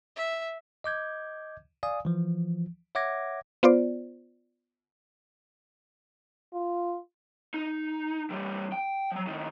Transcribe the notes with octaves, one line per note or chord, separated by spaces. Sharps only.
E5
D#5 D6 G6 G#6
D5 F5 G#5 D#6
E3 F3
C#5 E5 F#5 D6 G#6 A#6
B3 F4 C5 D5
F4
D#4
E3 G3
G5
F3 F#3
A2 D#3